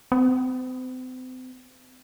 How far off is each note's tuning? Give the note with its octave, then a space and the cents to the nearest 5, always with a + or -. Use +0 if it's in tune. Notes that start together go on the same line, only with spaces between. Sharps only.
C4 -40